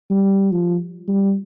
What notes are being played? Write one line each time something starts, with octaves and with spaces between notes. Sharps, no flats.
G3
F3
G3